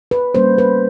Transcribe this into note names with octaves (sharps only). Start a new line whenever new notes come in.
B4
G3 A#3 C#4 C5
B4